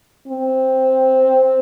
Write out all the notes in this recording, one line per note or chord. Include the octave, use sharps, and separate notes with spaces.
C4